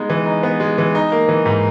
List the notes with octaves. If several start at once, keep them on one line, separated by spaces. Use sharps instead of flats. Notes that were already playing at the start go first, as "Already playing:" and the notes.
Already playing: G#3 B3 D#4
E3
D#4
B3
G#3
E3
D#4
A#3
E3
G#2